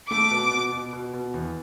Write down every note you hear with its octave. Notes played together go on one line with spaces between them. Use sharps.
A3 D6
B2
B2
B2
B2
B2
E2